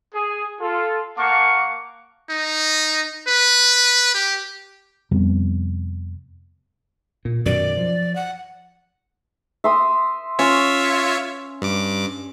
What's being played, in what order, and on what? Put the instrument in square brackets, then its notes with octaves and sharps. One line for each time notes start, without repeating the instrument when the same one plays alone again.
[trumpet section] G#4
F4 A4
A#3 F5 F#5 A5 C#6 D6
[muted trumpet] D#4
B4
G4
[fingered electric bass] F2 C3 G3 B3
[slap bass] A#2
[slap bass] F#2 B2 D#3 [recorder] D5
[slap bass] F3
[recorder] F#5
[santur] E5 C6 D#6
[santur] C#4 [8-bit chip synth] F4 C#5 E5
[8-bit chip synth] G2 D6